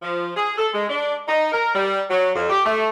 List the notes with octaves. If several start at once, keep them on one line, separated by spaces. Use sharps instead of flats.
F3
G#4
A4
G#3
D4
D#4
A#4
G3
F#3
F2
G4
A3